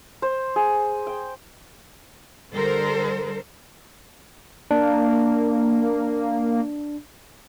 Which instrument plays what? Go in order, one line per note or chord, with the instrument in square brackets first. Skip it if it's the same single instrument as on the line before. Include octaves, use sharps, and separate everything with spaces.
[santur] C5
G#4
G5
[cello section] D3 G3 A4 A#4 C5
[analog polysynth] A#3 [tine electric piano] D4